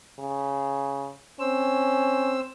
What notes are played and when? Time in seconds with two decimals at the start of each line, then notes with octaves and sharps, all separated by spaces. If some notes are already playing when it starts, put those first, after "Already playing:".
0.19 C#3
1.40 C4 C#4 C5 E6